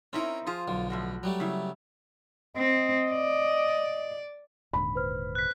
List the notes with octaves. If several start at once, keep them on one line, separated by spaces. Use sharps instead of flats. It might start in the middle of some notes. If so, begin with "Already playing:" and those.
C4 C#4 D#4 E4 A#4
F3 F4 G#4 C5
B1 D3
A2 F3 F#4
F#3 G3 A3
C#3 E4
C4 D#5
D5
D#1 G#2 D3 B5
B4 C5 F6
F#6 B6